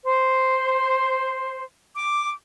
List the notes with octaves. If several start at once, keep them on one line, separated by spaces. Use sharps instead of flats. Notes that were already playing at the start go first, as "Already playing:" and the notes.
C5
D6